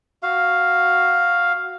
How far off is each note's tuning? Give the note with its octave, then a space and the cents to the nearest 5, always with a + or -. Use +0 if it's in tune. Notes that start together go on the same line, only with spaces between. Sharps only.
F#4 +0 F5 +0